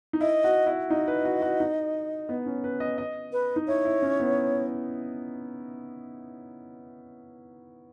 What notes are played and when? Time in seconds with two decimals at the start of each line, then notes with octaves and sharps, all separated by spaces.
0.13 D#4
0.21 E4 D#5
0.44 F#4
0.67 E4
0.90 D#4 D#5
1.08 B4
1.25 F#4
1.42 F#4
1.60 D#4
2.29 B3
2.46 C#4
2.64 B4
2.80 D#5
2.98 D#5
3.32 B4
3.56 D#4
3.67 E4 C#5
3.85 E4
4.02 C#4
4.20 B3